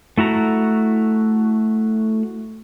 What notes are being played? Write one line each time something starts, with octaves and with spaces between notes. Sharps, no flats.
A3 E4 F#4 A#5